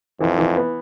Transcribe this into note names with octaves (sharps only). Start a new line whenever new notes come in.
F2 E3
E3
B3